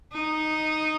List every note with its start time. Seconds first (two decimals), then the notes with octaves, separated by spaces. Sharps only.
0.13 D#4